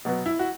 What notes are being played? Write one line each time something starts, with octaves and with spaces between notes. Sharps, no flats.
B2 F#3 B3
E4
F#4